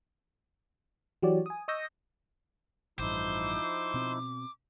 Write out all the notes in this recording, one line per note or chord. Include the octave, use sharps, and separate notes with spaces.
E3 F#3 F#4 G4 C#5 D5
G#5 D#6
D#5 C#6 D#6 E6 G6 A#6
A1 G2 F3 D#4 E4 C5 D6
B2 C4